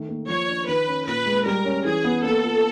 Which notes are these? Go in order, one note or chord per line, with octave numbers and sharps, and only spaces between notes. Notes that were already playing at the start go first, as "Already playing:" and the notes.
Already playing: D#3 A3
A#3
F3 C#5
D4
D#3 B4
C#4
A#2 B4
G#3
G3 A#4
C#4
E3 G#4
B3
A#3 A4
F4